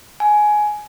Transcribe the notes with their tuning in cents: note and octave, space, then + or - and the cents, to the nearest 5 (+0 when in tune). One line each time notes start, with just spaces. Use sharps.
G#5 +15